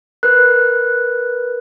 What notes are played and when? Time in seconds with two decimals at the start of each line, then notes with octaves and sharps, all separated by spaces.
0.23 A#4 B4 F#6